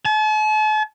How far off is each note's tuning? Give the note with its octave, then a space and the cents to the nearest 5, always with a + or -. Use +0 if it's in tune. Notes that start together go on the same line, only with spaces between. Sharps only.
A5 -45